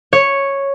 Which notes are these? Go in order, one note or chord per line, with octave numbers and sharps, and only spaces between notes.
C#5